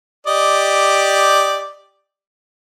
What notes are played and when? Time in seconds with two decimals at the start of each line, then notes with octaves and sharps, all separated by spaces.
0.27 G4 D5 D#5